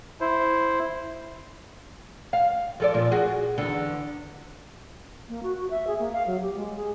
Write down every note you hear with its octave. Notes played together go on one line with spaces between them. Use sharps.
E4 C5
F5
F3 A4 D5
A#2 F3
F#4 G#4
E2 D3
A#3
F#4
F#4
E5
G#4
A#3
F5
F#3
G4
G#3
G#4